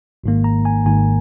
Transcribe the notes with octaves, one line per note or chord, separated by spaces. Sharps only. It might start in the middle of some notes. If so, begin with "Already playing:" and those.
G#1 G#2 D#3 A#3
A#5
G#5
G#1 G#2 D#3 A#3 G#5